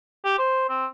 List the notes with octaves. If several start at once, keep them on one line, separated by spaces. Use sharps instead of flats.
G4
C5
C4